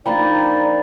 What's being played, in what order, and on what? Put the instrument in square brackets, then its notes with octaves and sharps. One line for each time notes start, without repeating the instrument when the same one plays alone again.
[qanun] F3 A#3 D4 [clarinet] D#4 [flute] D5 [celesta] G5 A#5 B5